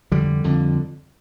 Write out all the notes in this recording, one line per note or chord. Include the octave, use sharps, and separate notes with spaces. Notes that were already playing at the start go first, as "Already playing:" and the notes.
F2 D3 G3
F2 D3